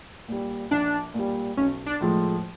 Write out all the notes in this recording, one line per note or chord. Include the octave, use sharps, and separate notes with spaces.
A#2 G3
A#1 D4
A#2 G3
B1 C#4
D4
A2 F3 G#3